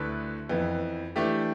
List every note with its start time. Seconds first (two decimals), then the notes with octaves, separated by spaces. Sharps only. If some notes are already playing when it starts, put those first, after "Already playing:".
Already playing: D2 D3 A3 E4 B4
0.49 F2 E3 B3
1.16 E3 A3 D4 G4